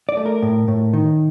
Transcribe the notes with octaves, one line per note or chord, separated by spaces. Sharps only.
D5
A3
A#4
A2
A2
D#3